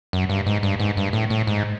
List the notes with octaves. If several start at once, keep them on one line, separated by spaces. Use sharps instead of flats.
F#2
G2
G#2
G2
G#2
G2
A2
A2
G#2